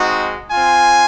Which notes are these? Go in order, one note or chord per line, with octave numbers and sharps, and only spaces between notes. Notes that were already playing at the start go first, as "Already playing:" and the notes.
Already playing: G#3 C4 D#4 F#4
C4 F4 G#5